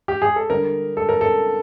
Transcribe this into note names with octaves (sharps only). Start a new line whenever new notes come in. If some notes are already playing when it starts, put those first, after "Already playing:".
G4
G#4
A4
D3 G3 A#4
A4
A#4
A4